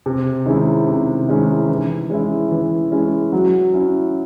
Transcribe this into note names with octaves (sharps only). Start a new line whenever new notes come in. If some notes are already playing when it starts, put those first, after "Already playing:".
C3
D#3 G#3 C#4 E4
C3
D#3 G#3 C#4 E4
E3
G#3 C#4 E4
E3
G#3 C#4 E4
F#3
C#4 E4